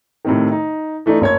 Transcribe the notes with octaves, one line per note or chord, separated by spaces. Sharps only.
A2 C3 D#3
D#4
E3 A3 D4 D#4
F#1 C#5 G#6